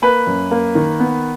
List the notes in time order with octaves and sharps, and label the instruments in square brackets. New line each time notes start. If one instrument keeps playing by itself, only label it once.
[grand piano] A#3 B4
F#2
A#3
D#3
B3